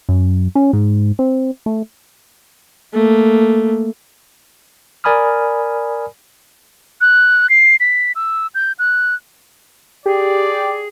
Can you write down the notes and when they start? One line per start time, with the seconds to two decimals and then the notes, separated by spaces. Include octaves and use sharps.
0.09 F#2
0.55 C#4
0.73 G#2
1.19 C4
1.66 A3
2.94 A3 A#3
5.04 A#4 D5 G#5 B5 D#6 F6
7.01 F#6
7.50 C7
7.80 B6
8.16 E6
8.55 G6
8.79 F#6
10.06 G4 G#4 D5